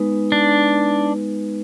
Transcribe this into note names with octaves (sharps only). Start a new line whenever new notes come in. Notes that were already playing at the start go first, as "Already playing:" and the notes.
Already playing: G#3 B3 D#4 B4
D4